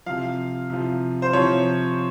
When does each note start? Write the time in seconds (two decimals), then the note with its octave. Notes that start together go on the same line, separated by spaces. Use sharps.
0.06 C3 F3 F5
0.70 C3 F3
1.22 C5
1.33 C3 F3 C#5